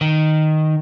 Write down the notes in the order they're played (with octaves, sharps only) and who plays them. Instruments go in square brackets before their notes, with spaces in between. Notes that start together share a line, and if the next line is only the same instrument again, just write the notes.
[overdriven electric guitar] D#3